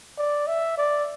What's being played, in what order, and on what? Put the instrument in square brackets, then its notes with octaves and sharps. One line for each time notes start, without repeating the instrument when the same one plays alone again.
[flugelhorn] D5
E5
D5